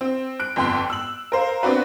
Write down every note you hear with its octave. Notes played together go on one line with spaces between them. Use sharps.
C4
F#6 D7
G1 F2 G5 C6 F#6
E6 F#7
A#4 C5 F5
B3 C4 D4 F#4 B4